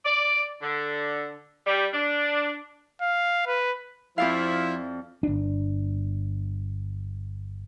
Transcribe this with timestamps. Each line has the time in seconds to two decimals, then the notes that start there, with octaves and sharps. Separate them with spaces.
0.05 D5
0.62 D3
1.65 G3
1.93 D4
3.01 F5
3.47 B4
4.18 F2 F3 E4 D5 F5
5.23 G1 D4